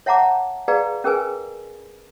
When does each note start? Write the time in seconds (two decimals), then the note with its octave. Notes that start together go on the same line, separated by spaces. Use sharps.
0.06 C#5 E5 F#5 A5 A#5 D6
0.68 G#4 B4 D5 F5 A#5
1.04 C#4 G#4 A#4 B4 G#5